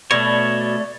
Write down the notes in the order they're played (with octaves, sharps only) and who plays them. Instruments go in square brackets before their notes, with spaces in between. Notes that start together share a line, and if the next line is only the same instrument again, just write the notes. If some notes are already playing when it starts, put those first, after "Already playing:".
[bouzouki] B2 [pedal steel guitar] A3 C#5 [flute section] D5